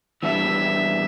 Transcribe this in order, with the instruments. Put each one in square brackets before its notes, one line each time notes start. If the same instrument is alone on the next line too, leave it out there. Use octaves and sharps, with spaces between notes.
[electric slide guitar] E3 G3 B3 D4 [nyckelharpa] E5